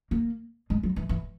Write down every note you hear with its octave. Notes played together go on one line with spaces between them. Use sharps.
A#3
G#3
F#3
E3
E3